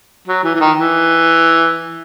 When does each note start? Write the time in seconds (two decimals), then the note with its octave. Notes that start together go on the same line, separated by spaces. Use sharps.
0.28 F#3
0.44 E3
0.54 E3
0.60 D#3
0.78 E3